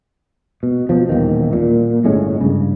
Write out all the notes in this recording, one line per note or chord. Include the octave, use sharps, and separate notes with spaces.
B2
B2 F3
D#1 E2 D#3
A#2
G1 A2 G#3 C#4
G2 C#3